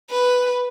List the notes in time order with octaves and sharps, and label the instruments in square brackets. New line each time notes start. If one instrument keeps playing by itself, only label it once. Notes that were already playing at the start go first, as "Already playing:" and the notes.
[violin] B4